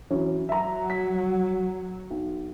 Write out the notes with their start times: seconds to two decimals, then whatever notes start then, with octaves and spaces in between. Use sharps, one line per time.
0.10 E3 F#3 C#4
0.49 F#3 E5 A#5
0.90 B6
2.10 B1